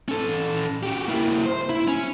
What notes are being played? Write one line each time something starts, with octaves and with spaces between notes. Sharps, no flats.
C#4 A4
F#4 G4
A#3 E4
C5
E4
C#4